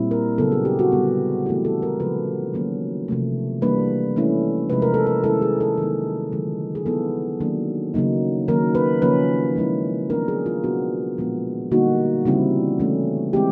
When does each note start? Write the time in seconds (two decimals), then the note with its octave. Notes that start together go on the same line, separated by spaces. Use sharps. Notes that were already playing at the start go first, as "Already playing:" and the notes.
Already playing: A#2 G3 C4 E4
0.11 A#4
0.38 C#3 F#3 B3 A4
0.52 G#4
0.65 G4
0.79 F#4
0.92 D3 G3 B3
1.46 E3 A3 C4 E4 G4
1.65 A4
1.82 A#4
2.00 C#3 F3 G#3 B4
2.54 D#3 F#3 A#3 C#4
3.08 C3 F3 A3
3.62 E3 G3 A#3 D4 B4
4.16 E3 A3 C#4 E4
4.70 C3 F3 G#3 B4
4.82 A#4
4.94 A4
5.07 A#4
5.24 D#3 G#3 C#4 E4 A4
5.42 G#4
5.61 A4
5.78 D#3 F#3 A#3 D#4
6.32 D3 F3 G#3
6.75 G#4
6.86 F#3 B3 E4 A4
7.40 D#3 F#3 A#3 D4
7.94 C#3 F#3 A#3 D#4
8.48 D#3 F#3 A#3 C#4 A#4
8.75 B4
9.02 C#3 F3 A#3 C#4 B4
9.56 F3 G#3 C#4 E4
10.10 F#3 B3 D4 A#4
10.28 G#4
10.46 F4
10.64 B2 F#3 B3 D4 F#4
11.18 A#2 F3 G#3 B3
11.71 D3 G3 A#3 D#4 F#4
12.25 C#3 E3 G3 C4 E4
12.80 E3 A3 C#4
13.33 E3 G#3 C4 G4